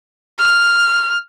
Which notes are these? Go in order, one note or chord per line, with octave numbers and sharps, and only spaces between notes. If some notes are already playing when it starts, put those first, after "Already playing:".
F6